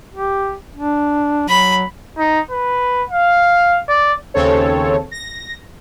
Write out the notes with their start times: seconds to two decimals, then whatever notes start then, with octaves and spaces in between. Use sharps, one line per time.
0.14 G4
0.76 D4
1.48 F#3 B5
2.18 D#4
2.51 B4
3.10 F5
3.88 D5
4.34 D#2 C#3 C4 A4 C#5
5.11 A#6